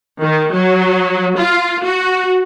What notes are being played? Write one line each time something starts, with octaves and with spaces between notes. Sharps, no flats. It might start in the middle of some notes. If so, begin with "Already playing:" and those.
D#3
F#3
F4
F#4